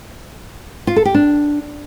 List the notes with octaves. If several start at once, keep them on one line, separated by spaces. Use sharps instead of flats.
F4
A4
G4
D4